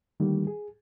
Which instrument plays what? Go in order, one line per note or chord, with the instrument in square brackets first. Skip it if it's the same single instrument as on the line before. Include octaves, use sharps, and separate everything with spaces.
[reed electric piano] D3 D#3 G3 A3 A#3
G#4